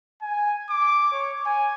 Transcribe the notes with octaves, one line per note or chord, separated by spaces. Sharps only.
G#5
D6
C#5
G#5